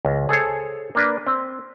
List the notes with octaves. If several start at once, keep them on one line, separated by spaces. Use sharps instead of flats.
C#2
G#4 A4 C5 C#5
A#3 D4 B4
C4